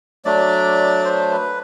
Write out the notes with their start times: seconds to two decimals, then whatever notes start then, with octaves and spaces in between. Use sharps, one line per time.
0.25 F#3 A3 D4 D5
1.04 C5
1.31 B4